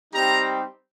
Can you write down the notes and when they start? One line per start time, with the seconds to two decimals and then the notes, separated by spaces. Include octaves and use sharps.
0.12 G3 C4 D#4 G4 A#5